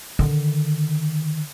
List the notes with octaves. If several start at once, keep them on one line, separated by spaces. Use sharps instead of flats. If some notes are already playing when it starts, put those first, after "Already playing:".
D3 D#3